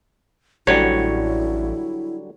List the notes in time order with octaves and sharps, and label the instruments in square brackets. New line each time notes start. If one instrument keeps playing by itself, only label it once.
[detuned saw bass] A1 [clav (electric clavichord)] D3 F#3 G3 [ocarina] E4 [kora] C#5